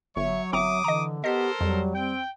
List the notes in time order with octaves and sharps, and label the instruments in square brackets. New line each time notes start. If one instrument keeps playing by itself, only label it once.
[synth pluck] G1 [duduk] F#3 [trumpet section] C#5 C#6 [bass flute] E5
[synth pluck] G1 C4 A#5 [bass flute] E5 [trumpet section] D6 D#6
[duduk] D3 [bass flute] E3 [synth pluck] D#5 A#5
[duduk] B3 [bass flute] G4 [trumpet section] A4 A#4 C5 [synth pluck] D#5 B6
[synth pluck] F2 [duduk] F#3 [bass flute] G3
[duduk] C4 [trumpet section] G5